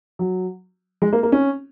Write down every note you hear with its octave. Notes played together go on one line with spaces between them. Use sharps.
F#3
G#3
A#3
A#3
C#4